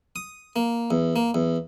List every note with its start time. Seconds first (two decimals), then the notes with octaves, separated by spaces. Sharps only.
0.16 D#6
0.56 A#3
0.91 E2
1.16 A#3
1.35 E2